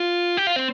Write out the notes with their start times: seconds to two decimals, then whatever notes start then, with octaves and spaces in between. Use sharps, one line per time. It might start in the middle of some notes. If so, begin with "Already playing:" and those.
Already playing: F4
0.37 G4
0.47 F4
0.56 C4